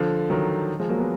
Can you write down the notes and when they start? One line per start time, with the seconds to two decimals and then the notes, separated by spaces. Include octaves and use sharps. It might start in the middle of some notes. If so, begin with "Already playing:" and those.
Already playing: D3 F3
0.30 D#3 F#3
0.80 F3 G#3
0.89 F#3 A#3
0.99 G#3 B3